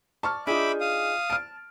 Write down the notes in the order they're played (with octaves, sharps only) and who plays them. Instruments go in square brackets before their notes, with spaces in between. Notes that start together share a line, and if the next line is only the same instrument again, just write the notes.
[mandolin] D5 [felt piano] A5 C#6 F6
[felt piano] D4 F4 [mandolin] D#4 G#4 [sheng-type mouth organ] E5 B5 D6
[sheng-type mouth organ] F5 D#6
[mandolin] A5 [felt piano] F6 D7